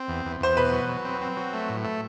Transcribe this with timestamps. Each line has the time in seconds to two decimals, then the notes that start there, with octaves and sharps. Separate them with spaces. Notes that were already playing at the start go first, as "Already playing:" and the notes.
Already playing: C4
0.08 E2
0.25 E2
0.40 E2 C5
0.57 B2 B4
0.73 F#3
0.89 F#3
1.05 C4
1.21 C4
1.37 F#3
1.53 A3
1.69 A2
1.85 A3